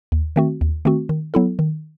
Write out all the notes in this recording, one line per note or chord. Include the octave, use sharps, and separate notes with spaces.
D#2
D#3 A3 C4 F#4
D#2
D#3 A3 C4 F#4
D#3
F#3 B3 E4 A4
D#3